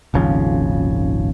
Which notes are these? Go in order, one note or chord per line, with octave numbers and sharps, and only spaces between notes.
D#1 G#1 C#3 F3